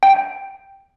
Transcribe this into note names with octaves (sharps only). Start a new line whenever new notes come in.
G5